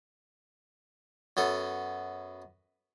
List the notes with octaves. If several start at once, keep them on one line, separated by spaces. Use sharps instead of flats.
F#2 B3 A4